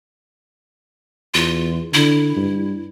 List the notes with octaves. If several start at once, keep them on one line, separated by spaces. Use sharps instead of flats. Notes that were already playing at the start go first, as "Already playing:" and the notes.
E2 F4
D3 E4
G2